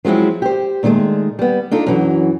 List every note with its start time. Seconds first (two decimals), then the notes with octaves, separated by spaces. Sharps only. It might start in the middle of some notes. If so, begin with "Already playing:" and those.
0.05 F3 F#3 G#3 C4 E4
0.42 G4 C5
0.83 A#2 D#3 F#3 G#3 A3
1.39 G3 B3
1.71 D4 D#4 F4 A4
1.86 F#2 E3 F#3